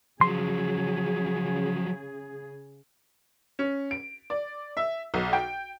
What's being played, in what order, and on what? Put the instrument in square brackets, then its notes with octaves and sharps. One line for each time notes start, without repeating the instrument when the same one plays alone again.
[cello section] C#3 G#4 [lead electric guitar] F3 F#3 [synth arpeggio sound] C6
[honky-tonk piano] C#4
D7
D5
E5
B1
G5